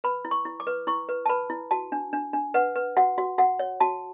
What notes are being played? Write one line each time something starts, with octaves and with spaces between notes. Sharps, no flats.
B4 B5
E4
C#6
E4
D6
B4
E4 C#6
B4
A5
B4 B5
E4
F#4 A5
D4
D4
D4
B4 F#5
B4
F#4 F#5
F#4
F#4 F#5
C#5
F#4 A5